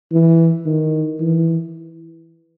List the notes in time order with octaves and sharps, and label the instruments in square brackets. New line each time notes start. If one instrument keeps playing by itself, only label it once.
[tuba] E3
D#3
E3